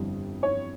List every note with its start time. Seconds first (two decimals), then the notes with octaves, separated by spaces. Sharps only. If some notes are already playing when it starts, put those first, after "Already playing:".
Already playing: G1 F2 E3 G3
0.43 C#5